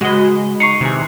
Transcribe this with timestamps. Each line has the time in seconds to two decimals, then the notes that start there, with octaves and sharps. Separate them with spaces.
0.01 C#2 G#3 F#4 B4 D#5
0.60 D#4 C#6 C7 C#7
0.81 C3 D#3 E3 G#4